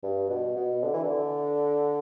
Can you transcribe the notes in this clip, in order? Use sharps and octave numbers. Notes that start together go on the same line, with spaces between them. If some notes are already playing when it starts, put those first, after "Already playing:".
G2
B2
B2
D3
E3
D3